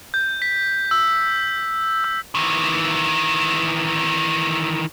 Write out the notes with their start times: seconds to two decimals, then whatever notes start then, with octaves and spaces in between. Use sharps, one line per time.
0.14 G6
0.42 B6
0.91 E6
2.04 E6
2.35 D#3 E3